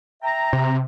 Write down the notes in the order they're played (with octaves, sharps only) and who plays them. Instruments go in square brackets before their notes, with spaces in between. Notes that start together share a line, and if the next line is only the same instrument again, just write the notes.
[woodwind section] E5 G5 A#5
[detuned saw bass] C3